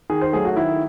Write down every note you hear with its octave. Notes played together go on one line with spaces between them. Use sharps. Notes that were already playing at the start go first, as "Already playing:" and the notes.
D#3 G#4
C5
F#3 A3 G#4
F#4
D#3 E4